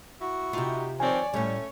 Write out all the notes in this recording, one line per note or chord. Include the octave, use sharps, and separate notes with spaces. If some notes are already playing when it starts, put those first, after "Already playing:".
E4 F#4
C3 D#4 F4 G4
D#3 F3 C4 C#5 D5 G#5
A2 G3 A3 C#4 C#5